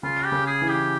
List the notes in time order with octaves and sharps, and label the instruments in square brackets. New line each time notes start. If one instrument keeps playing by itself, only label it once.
[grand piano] C#3 [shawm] F4
[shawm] G4
[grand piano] C#3
[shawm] G#4
[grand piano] E3
[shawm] G4